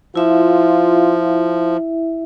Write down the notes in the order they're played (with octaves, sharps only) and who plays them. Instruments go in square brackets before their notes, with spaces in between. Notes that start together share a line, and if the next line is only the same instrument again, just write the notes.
[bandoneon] F3 [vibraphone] E4 E5 [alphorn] F4